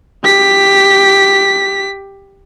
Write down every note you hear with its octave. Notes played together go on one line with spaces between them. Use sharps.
G4 B6